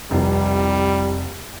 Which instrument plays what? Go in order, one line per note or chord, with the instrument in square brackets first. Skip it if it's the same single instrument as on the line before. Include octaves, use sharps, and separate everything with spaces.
[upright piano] F1 C2 [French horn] G3